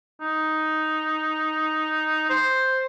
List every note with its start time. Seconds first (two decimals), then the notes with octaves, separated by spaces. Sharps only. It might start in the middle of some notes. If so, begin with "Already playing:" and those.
0.21 D#4
2.29 C5